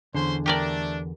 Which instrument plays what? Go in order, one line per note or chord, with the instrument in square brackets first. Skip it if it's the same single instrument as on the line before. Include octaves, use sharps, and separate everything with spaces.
[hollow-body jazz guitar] E2 D3 [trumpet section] C#4 C5 C6
[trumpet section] A3 D4 [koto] G4 A#4 D5